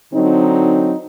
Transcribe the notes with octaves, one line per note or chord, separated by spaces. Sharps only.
D3 F#3 C4 D#4